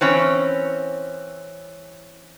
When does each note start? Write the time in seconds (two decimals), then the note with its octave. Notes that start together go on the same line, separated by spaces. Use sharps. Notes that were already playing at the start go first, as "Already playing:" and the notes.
0.01 E3 C4 C#4